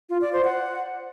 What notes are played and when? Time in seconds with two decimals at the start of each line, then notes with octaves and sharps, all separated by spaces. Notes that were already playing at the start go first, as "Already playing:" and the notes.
0.10 F4
0.21 D5
0.33 C5
0.44 F#5